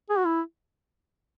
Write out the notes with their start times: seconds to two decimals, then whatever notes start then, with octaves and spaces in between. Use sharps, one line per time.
0.10 G#4
0.18 F#4
0.26 E4